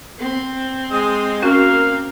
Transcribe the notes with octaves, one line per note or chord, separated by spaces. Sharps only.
C4
G#3 D#6
A#3 C#4 F#4 F5